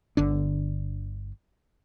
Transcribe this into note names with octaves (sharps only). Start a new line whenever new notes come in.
G1 D3 D4